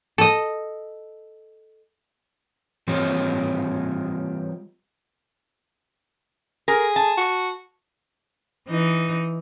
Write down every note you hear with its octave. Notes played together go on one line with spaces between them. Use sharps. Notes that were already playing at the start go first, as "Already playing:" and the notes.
A4 D#5
E3 G3 C4 F4 G4 C#5
G#4 A#4
A5
F#4
E3 D#4